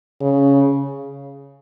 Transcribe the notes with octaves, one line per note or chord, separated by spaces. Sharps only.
C#3